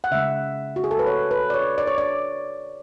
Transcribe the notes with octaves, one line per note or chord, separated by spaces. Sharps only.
F#5
C#3 G#3 E5
F#4
G#4
A4
B4
C#5
B4
D5
C#5
D5
C#5
D5